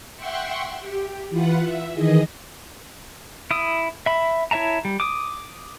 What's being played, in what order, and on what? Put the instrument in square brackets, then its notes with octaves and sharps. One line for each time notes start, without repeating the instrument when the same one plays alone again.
[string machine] E5 F#5 G5 C6 C#6
G4
E3 F4 B4 F#5
E5
D#3 E3 G#4 D#5
[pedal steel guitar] E4 D#6
E5 B5
E4 C#5 E5 A5 A#5
G3
D6 D#6